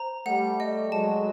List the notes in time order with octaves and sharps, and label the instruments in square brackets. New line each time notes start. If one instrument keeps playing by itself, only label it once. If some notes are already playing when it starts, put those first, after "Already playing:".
Already playing: [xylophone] C5 A#5
[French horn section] G3 A3 [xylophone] F#5
[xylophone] D#5
[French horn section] F#3 G#3 [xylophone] A5